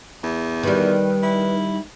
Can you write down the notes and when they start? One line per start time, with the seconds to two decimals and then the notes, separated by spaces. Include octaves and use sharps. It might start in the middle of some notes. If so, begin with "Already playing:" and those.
0.23 E2
0.63 D#3 G3 B4
1.23 E4